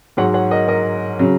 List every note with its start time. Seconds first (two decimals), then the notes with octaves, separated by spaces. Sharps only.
0.17 G#2 F#3 C#5 F#5
0.34 C#5 F#5
0.51 A#4 D#5
0.68 A#4 D#5
1.19 C#3 F#3